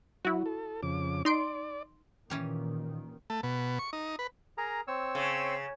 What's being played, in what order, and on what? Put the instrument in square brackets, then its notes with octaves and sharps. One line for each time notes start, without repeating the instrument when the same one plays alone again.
[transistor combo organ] F#3 [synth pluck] E4 F#4
[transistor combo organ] A4
F2 C#3 D6
[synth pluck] D#4 C6 D7 [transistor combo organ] D5
[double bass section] A#2 D#3 [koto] E3 C#4 G4
[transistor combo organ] A3
B2
C#6
D#4
B4
[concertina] G#4 A#4 A#5
C4 C#5 E6
[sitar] C#3